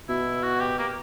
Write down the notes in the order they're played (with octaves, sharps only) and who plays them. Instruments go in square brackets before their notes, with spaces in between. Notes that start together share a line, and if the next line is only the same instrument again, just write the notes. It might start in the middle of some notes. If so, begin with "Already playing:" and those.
[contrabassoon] B2 [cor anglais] E4
[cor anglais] F#4
G4
A#3